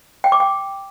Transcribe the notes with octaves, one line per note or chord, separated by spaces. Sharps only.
G5
D6
G5